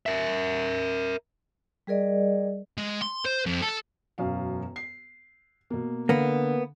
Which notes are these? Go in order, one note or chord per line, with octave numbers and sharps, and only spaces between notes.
A#4 E5
G3 G#4 A#4 D5 D#5
G#3
C6
C5
F2
A4
E1 F#2 F5
C7
B2 A#3
D3 A#3 B3